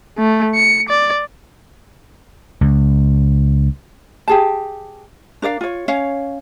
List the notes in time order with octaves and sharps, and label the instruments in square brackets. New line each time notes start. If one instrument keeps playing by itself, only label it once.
[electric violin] A3
C#7
D5
[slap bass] C#2
[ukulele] G4 G#4 A5
D4 A#4 D5 F5
F4 C#5
C#4 C#5 F5